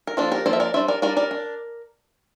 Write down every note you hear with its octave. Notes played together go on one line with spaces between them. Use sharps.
A#4
F3 A#3 D4 F4 A4
G4 A#4
F3 A#3 D4 A4 C5
E5
A#4 D5
G3 D4 C5 E5
A#4 D5
G3 D4 A#4 D5
A#4 D5
D4